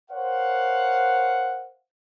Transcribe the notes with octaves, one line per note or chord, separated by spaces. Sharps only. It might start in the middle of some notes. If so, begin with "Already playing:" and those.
A#4 C5 C#5 F5 F#5